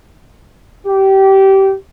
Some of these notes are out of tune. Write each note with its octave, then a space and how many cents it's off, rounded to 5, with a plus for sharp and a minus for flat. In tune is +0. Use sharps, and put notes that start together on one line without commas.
G4 -20